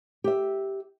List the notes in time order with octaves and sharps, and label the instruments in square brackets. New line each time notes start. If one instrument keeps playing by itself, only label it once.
[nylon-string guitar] G4 E5